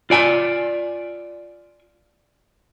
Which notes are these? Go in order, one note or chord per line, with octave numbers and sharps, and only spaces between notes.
F4 D5 G#5